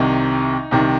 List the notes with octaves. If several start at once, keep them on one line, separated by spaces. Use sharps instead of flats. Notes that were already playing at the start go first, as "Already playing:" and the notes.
Already playing: C2 C3 D#3 D#4
C2 C3 D#3